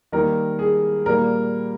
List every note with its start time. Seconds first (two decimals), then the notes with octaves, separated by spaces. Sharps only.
0.12 D#3 G3 A#3 A#4
0.59 G#4
1.06 A#2 G3 A#3 A#4